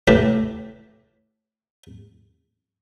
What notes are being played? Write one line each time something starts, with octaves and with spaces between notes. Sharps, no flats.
A2 A3 G4 A#4 B4